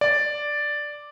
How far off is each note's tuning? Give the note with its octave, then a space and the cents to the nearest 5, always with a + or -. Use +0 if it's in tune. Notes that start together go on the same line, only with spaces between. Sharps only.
D5 +0